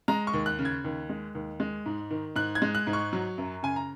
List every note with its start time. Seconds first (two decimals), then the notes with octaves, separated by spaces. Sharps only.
0.08 G#3 A#5
0.27 C#6
0.33 D#2
0.46 F#6
0.59 C#3
0.65 G#6
0.84 D#2
1.09 G#3
1.35 D#2
1.60 G#3
1.86 G#2
2.11 D#3
2.36 G#2 F#6
2.55 G#6
2.62 G#3
2.75 F#6
2.87 G#2
2.93 C#6
3.13 F#3
3.38 F#2
3.63 C#3 G#5
3.76 A#5